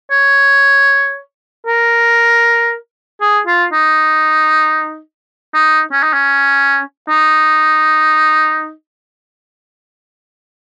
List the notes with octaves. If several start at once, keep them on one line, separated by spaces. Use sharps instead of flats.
C#5
A#4
G#4
F4
D#4
D#4
C#4
D#4
C#4
D#4